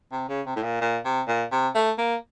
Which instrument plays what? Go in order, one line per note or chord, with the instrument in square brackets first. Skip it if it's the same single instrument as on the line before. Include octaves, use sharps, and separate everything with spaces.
[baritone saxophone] C3
C#3
C3
A2
A#2
A#2
C3
A#2
C3
A3
A#3